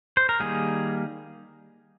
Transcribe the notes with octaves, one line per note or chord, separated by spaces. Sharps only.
C5
A#4
D#3 G3 A#3 G#4